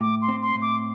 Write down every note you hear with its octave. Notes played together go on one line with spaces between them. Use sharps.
A2 D6
C6
C4
C6
A2
D6